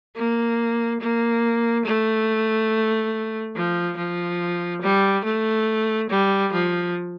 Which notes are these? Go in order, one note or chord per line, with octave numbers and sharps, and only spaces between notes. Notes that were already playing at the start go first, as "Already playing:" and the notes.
A#3
A#3
A3
F3
F3
G3
A3
G3
F3